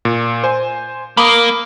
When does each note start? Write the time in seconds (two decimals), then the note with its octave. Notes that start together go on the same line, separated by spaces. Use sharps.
0.05 A#2
0.44 C5 G#5
1.17 A#3 B5 D6 D#6